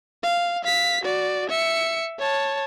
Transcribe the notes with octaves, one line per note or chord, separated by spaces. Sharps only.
F5
F5 B6
F#4 D5
E5 C#7
C#5 A5